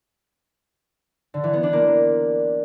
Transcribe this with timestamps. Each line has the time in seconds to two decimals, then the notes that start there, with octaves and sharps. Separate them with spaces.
1.34 D3
1.44 E3
1.53 B3
1.63 D4
1.73 A#3